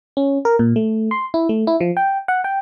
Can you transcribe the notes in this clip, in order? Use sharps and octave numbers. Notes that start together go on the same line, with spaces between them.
C#4
A#4
A#2
A3
C6
E4
A3
E4
F3
G5
F#5
G5